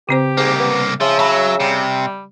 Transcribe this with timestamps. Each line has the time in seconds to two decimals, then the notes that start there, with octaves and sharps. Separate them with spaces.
0.09 C#3 C4 G4 C5
0.37 C2 G#2 A#3
0.60 B3
1.01 C#3 F3 E5
1.19 F#3 C#5 A5 B5
1.60 C3 G3